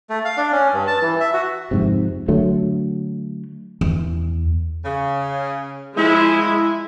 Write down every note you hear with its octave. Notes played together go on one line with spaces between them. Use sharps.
A3
F5
D4
C#4
G2
A5
E3
E5
F#4
F2 G#2 C3
D3 F#3 A3
E2
C#3
F3 G#3 E4
E4